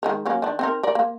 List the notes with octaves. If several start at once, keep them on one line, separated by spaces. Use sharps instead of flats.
D#3 G#3 A#4
F#3 A#3 C#4
D#3 D4
C4 D#4 A#4
A#4 D5
A#3